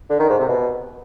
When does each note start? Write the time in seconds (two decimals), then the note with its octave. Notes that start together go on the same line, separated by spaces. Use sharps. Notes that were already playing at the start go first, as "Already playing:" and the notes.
0.10 D3
0.19 D#3
0.29 G#2
0.39 C3
0.49 B2